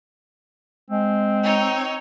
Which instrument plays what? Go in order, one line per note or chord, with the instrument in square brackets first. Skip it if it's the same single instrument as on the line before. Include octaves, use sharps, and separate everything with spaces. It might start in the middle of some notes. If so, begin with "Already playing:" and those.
[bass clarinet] G#3 [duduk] C4
[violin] D#4 C#5